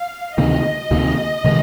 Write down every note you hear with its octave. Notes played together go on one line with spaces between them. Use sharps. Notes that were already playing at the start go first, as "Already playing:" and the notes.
Already playing: F5
D2 C3 D#3 A#3 D#5
D2 C3 D#3 A#3
C3 D#3 G#3